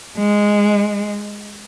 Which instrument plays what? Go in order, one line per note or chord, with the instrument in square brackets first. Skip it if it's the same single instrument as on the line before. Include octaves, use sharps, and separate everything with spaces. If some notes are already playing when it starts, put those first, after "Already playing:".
[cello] G#3